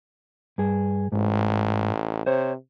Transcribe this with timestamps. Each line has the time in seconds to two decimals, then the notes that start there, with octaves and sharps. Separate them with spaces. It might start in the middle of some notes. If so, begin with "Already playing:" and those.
0.58 G2 G#4
1.12 A1 G#2
2.26 C3 C5 C#5